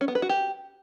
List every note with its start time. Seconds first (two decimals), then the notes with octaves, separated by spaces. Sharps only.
0.01 C#4
0.08 B3
0.15 B4
0.22 F#4
0.29 G4